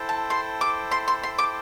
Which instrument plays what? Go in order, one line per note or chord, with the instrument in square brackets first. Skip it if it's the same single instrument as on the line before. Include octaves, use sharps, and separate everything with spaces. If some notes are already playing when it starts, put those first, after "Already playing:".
Already playing: [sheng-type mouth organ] E4 A4 C5 G5
[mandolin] A5
C6
D6
C6
C6
C6
D6